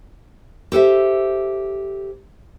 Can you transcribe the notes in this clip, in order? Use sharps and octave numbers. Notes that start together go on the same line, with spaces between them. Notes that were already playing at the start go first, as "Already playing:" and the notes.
G4 A4 C5 E5